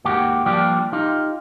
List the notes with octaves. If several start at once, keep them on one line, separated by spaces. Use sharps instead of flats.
D#2 G#2 A#3 F#4 G4
F3 G3 A#3 D4 F4 G4
D#4 F4 G4